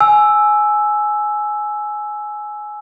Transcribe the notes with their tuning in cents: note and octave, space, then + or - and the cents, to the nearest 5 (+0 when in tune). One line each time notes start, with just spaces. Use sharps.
G#5 +15 E6 +0